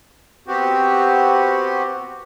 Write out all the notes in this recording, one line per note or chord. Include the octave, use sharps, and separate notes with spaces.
B3 C4 F#4 G4